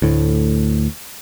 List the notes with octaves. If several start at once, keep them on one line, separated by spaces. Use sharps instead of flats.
D2 A2